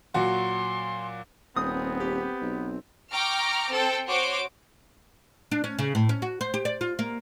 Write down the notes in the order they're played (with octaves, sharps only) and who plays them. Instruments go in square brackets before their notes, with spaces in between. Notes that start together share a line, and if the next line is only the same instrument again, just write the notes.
[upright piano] A#2 F#3 F#4 [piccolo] C6
[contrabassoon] D#1 [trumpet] B3 [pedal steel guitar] C4 [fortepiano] D#6
[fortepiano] G4
[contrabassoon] B1
[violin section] G5 A#5 C#6 D6 F6
C4 A4 G5
F#4 C5 C#5 C6 D6
[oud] D4
C#4
C#3
A2
C#4
F#4
C5
G4
D5
F4
A#3